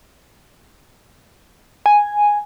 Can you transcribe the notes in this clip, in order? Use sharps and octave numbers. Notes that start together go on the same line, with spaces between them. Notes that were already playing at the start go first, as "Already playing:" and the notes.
G#5